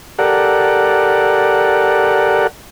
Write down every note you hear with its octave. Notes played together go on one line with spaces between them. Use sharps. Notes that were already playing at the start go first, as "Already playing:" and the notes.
G4 A4 A#4 D5 F#5